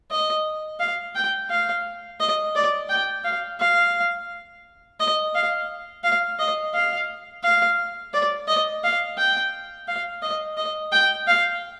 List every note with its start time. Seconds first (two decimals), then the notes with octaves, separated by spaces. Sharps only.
0.11 D#5
0.80 F5
1.15 G5
1.50 F5
2.20 D#5
2.55 D5
2.89 G5
3.24 F5
3.60 F5
5.00 D#5
5.35 F5
6.04 F5
6.39 D#5
6.74 F5
7.43 F5
8.14 D5
8.48 D#5
8.84 F5
9.18 G5
9.88 F5
10.22 D#5
10.57 D#5
10.92 G5
11.27 F5